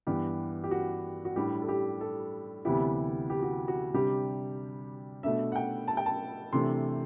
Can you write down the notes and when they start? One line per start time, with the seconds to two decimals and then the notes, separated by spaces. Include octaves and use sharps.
0.07 G2 E3 B3 G4
0.64 G4
0.71 F#4
1.25 F#4
1.36 A2 G3 D4 G4
1.62 A4
1.68 G4
2.01 A4
2.65 D2 C3 E3 B3 E4 G4
3.30 G4
3.42 F#4
3.68 F#4
3.94 C3 G3 D4 G4
5.23 B2 A3 D4 E5
5.52 F#5
5.56 G5
5.88 A5
5.97 G5
6.06 A5
6.53 C3 E3 A3 D4 C6